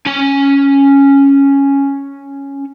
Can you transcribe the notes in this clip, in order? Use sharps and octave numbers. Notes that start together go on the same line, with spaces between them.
C#4 G#5